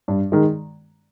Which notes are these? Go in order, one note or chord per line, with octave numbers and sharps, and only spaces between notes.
G2
D#3 G#3